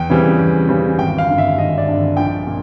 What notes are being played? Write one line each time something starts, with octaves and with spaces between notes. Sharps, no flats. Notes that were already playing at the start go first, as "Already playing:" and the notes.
Already playing: E2 G5
C#3 E3 G3 C4
E2
C#3 E3 G3 C4
G#1 G5
F5
G2 D3
E5
G#1 D#5
D5
G2 D3
A#1 G5
A#2 A#3